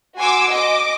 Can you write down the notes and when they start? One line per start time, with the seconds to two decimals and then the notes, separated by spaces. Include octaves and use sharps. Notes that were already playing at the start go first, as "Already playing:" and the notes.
0.18 F#4 G#5 C6 D6 E6
0.49 D#5 D6